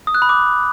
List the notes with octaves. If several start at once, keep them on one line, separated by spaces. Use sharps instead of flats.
D#6
F#6
B5
D6